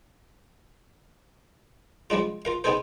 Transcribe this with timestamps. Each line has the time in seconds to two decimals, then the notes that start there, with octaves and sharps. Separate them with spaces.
2.10 F3 G3 G#3 D4 F4
2.45 F4 A#4 F5
2.64 B3 C4 D#4 G#4 A4 C5